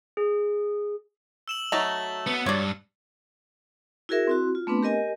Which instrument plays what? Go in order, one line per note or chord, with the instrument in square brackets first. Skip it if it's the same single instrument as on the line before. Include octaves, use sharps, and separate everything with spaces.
[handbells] G#4
[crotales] E6 E7 F#7
[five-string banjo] F#3 D#4 A#5 [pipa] A3
[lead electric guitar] B3 [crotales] C#7
[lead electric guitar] G2 [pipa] C#5 D5
[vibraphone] E4 F#4 G#4 A#4 E5
C4 E4 F#4
F4
A3 B3 C4 D4 B4
G4 A#4 D#5 G#5